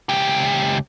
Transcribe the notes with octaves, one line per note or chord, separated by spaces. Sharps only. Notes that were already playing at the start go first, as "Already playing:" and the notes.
C#2 G4